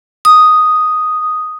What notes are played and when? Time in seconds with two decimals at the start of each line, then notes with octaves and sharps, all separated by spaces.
0.25 D#6